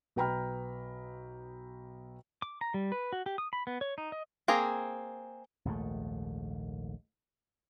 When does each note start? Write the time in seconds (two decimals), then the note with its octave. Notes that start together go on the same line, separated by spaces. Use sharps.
0.16 B1 B4 G5 A#5 B5 F6
2.42 D6
2.61 A#5
2.74 G3
2.92 B4
3.13 F#4
3.26 G4
3.38 D#6
3.53 B5
3.67 B3
3.81 C#5
3.98 D#4
4.12 D#5
4.48 A#3 C4 G#4 A#5
5.65 A#1 D#2 G#2 A3